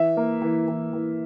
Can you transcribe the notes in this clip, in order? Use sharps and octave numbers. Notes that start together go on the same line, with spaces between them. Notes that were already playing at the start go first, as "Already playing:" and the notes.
Already playing: E3 E5
A#3
E3
E3
E3